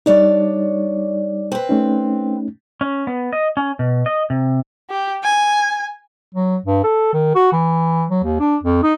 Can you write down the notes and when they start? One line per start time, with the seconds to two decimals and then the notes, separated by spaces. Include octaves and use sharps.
0.06 G3 D4 D#4 C#5 D5
1.52 C4 B4
1.69 A3 C#4 D#4
2.81 C#4
3.07 B3
3.33 D#5
3.57 C#4
3.79 B2
4.06 D#5
4.30 C3
4.90 G4
5.23 G#5
6.35 F#3
6.66 G2
6.84 A4
7.14 D#3
7.35 F#4
7.53 E3
8.10 F#3
8.24 D#2
8.40 D4
8.63 F2
8.83 D#4